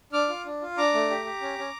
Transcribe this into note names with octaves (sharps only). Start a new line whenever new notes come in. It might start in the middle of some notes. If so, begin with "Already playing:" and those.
D4 D6 F6
F4
D4
F4
D4 A#5 D6
A3
G4
G4
C#4
C#4